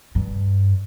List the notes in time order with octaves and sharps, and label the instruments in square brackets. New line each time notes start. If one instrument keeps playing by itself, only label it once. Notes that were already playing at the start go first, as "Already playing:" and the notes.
[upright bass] G2